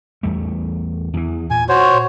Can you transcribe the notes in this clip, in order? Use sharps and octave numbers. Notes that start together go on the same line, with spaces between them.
E2 G3 A3
E2 E3
A#2 G#5
F#4 C5 C#5